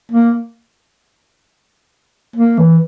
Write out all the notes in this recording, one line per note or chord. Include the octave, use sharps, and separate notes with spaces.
A#3
A#3
E3